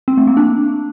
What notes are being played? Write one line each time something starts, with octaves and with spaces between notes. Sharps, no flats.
C4
A3
A#3
D4